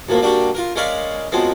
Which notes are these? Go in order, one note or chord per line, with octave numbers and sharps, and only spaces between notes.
F#2 A2 F3 A#3
G3 A#3 D4 F#4 G4
F4 A#4
G#3 C#4 A#4 D5 F5 B5
F#2 F3 G#3 B3 C4